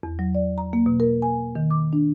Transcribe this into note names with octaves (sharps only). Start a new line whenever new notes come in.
E2
F#3
D5
A#5
A#3
B2
A#4
G#5
D#3
D6
D4